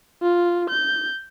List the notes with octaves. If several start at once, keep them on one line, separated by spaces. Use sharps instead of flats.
F4
G6